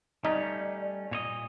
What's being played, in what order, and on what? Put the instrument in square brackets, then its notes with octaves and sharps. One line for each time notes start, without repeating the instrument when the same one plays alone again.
[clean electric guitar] G3 A3 C#4 [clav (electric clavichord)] D#4 [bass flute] D5
[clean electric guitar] A#2 C#5 D#5